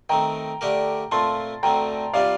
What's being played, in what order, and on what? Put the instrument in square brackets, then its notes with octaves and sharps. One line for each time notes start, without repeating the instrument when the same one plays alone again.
[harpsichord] D#3 A3 C4 [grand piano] G5 A#5
[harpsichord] D3 A3 D4 G4 A#4
[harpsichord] A#2 A3 C4 F4 [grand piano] A5 C6
[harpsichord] D2 D3 A3 C4 [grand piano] G5 A#5
[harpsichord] C3 G3 D4 F4 [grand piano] D5 F5